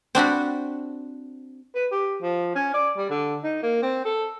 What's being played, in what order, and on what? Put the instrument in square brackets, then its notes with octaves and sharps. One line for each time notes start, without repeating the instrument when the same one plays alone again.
[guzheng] C4 D4 F#4 B5
[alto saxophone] B4
G4
F3
C#4
D5
G3
D3
D#4
A#3
C4
A4